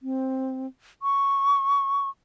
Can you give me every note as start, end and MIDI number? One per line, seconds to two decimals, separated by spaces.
0.02 0.67 60
1.03 2.09 85